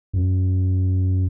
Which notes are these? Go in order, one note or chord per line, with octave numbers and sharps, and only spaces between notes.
F#2